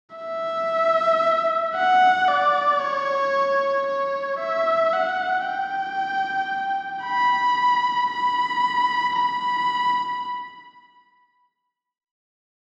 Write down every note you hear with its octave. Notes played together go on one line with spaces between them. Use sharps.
E5
F#5
D5
C#5
C#5
E5
F#5
G5
B5
B5
B5